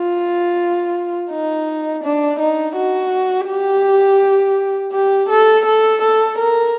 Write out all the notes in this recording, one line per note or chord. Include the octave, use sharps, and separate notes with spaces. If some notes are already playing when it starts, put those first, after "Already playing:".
Already playing: F4
D#4
D4
D#4
F#4
G4
G4
A4
A4
A4
A#4